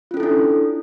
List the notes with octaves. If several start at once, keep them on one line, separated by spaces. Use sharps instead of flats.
C#4 D4 E4 F4 A4